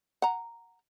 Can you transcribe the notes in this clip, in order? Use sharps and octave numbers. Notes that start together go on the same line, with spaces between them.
F#5 A#5